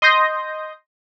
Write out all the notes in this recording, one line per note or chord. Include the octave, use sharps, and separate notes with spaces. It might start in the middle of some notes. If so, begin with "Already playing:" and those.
D#5 C6 D#6 G6 A#6